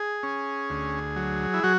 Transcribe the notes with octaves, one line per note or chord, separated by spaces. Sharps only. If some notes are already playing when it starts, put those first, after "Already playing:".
Already playing: G#4
C#4
D2
F#3
E4
F#3 F#4